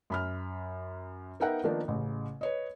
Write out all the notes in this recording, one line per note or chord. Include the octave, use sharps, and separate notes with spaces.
F#2 B5 F6
B3 D#4 A#4 E5 F#5 G5
D#3 F3 A#3 B3 D4 D#4
A1 C#3
B4 C#5 D#5